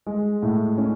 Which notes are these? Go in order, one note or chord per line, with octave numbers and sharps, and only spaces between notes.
G#3
A2
C#4